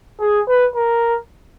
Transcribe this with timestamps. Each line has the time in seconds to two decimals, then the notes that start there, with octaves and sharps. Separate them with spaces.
0.21 G#4
0.48 B4
0.76 A#4